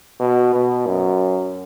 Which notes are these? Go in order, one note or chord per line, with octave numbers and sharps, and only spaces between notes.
B2
B2
F#2